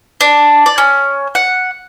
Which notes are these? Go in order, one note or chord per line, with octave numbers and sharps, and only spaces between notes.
D4
D5
C#4
F#5